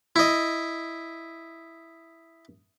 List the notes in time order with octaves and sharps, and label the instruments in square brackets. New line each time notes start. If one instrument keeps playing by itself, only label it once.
[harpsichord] E4 D#5